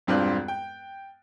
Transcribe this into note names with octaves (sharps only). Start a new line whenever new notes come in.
E1 G2 C4 F4 D5 F#6
G5